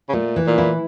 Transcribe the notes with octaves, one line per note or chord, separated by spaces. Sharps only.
C#3
A#2 A3
E3
A#2
E4